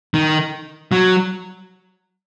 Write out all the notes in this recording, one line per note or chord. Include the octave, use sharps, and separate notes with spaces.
D#3
F#3